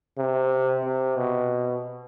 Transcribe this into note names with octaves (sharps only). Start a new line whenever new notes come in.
C3
C3
B2